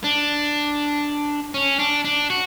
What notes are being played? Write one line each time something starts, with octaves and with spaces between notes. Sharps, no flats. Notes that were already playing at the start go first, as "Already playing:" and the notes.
D4
C#4
D4
D4
F#4